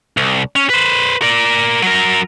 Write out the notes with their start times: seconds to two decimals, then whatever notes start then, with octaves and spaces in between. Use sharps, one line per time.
0.17 C2
0.56 C#4
0.70 B4 C5
1.22 A#4 D5
1.82 F#3 A#4